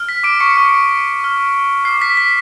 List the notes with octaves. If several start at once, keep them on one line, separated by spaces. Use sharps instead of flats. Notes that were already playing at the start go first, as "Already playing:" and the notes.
Already playing: F6
B6
D6 D7
C#6 C#7
C#6 D6 F6 C#7
D6 F6
D6 F6 C7
B6
B6